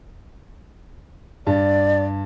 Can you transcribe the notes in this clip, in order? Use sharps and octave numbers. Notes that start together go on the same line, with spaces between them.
G2 D5